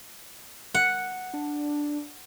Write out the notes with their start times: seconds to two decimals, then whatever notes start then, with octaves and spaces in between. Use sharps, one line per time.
0.74 F#5
1.33 D4